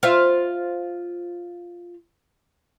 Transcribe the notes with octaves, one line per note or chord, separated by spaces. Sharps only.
F4 C5 E5